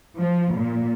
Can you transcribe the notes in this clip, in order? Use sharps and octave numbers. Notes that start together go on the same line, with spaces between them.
F3
A#2